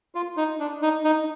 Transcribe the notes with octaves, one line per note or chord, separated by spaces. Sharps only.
F4
D#4
D4
D#4
D#4